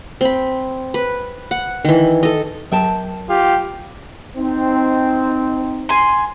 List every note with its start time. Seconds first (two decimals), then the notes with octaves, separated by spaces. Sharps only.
0.21 C4 B5
0.94 B4
1.51 F#5
1.85 D#3 E3
2.23 A4 D#5
2.72 F#3 A#4 G5 A5
3.29 F4 G4
4.37 C4 D#4
5.89 G#5 C6